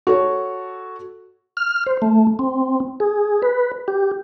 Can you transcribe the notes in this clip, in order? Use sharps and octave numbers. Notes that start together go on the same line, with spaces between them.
F#4 A4 C#5
F6
C5
A3
C4
G#4
B4
G4